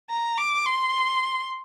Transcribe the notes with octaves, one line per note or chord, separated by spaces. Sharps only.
A#5
D6
C6